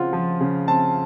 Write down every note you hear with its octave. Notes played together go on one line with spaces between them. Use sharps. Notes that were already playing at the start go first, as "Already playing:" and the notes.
Already playing: C#3 F3 C4 F4 F#5
F3
C#3
C4 A5